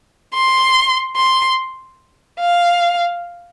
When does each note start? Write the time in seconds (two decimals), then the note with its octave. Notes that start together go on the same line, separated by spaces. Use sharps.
0.34 C6
1.17 C6
2.40 F5